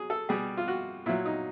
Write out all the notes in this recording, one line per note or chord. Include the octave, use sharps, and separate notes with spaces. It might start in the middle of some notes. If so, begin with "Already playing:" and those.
Already playing: F#3 G#4
A4
B2 G3 G#4
F4
F#4
A#2 F#3 E4
D#4